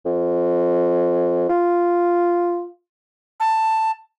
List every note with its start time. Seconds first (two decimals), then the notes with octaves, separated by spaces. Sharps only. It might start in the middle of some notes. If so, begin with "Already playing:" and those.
0.05 F2
1.49 F4
3.40 A5